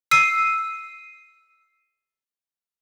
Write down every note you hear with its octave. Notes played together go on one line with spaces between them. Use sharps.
E6 C7 D#7